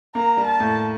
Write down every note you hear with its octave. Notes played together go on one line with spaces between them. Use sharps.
A#3 A#5
G3
A5
A2